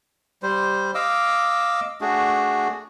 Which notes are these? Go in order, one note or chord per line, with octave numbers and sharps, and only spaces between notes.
G3 C5
D#5 F5 D6 E6
A3 D4 F#4 G#4